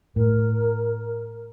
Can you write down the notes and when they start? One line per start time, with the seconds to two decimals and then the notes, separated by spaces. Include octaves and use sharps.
0.16 A2 A#4